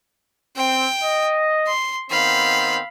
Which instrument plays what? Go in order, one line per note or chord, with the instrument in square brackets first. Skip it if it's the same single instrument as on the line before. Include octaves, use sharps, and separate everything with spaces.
[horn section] C4 [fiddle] G5
[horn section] D#5
[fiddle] C6
[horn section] D#3 B3 C4 [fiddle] F5 B5